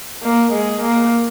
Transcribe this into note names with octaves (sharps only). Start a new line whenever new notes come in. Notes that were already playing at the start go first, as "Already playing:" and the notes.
A#3
G#3
A#3